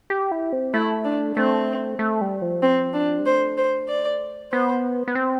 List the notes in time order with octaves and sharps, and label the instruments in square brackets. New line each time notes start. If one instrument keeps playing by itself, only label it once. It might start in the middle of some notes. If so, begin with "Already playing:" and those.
[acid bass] G4
E4
C4
[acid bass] A3 [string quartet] E4
[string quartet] D4
[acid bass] A3 [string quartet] C4
[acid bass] A3
G3
F3
[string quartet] C4
D4
[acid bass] G3
[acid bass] A3 [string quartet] C5
[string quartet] C5
D5
[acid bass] B3 [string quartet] C5
[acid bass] B3
C4